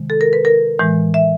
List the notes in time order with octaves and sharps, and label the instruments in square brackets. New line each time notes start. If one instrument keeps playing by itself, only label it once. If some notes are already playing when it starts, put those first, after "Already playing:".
Already playing: [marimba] C3 D#3 G#3
A4
A#4
B4
A#4
A2 E3 G#3
E5